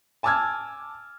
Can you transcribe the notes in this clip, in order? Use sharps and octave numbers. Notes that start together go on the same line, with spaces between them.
G#5 A5 D6 E6 F6 G#6